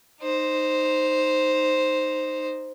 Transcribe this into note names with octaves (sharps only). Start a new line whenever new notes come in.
D#4 C5